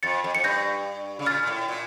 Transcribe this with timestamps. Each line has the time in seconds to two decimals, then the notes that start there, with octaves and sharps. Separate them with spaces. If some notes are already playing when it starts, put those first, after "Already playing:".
0.03 F2 A6 C#7
0.24 F2
0.35 F2 C#7
0.44 G2 G6 A#6
1.19 C#3
1.26 A#2 F6 A6
1.43 A#2
1.47 A2
1.68 A#2